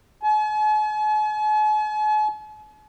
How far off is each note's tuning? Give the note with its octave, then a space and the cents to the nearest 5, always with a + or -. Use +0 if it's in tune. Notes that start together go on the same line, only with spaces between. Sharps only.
G#5 +45